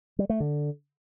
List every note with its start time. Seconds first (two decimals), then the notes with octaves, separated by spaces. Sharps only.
0.19 G3
0.30 A3
0.40 D3